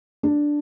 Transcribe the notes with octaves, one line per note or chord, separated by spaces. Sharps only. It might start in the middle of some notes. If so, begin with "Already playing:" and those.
D4